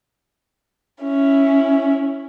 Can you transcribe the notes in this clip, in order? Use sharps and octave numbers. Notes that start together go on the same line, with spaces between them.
C#4 E4